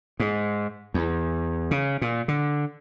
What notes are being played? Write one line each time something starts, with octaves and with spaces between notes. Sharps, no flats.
G#2
E2
C#3
A#2
D3